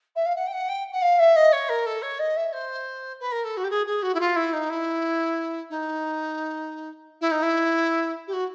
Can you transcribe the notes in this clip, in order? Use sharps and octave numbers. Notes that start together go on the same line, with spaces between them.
E5
F5
F#5
G5
F#5
G5
F#5
F5
E5
D#5
C#5
A#4
A4
C#5
D#5
E5
C5
B4
A#4
A4
F#4
G4
G#4
G#4
F#4
E4
F4
E4
D#4
E4
D#4
E4
D#4
E4
G4
F#4